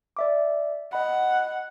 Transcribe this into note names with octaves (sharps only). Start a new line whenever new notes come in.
D5 E5 D6
D#5 F#5 B5